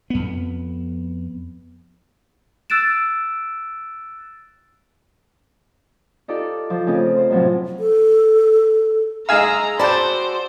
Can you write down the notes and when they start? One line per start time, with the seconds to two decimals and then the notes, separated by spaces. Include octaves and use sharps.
0.10 F2 B3
2.70 E6 F#6 A6 D7 E7
6.28 D#4 F4 G4 A4 D5
6.70 F3
6.86 C#3 A3 C4 D#4 F4 G#4
7.16 C5
7.30 F#2 A2 C3 F3 F#3 C4
7.79 A4
9.29 G#3 D#4 G#4 F5 A#5 E6
9.79 F#4 C5 D5 G5 A5 B5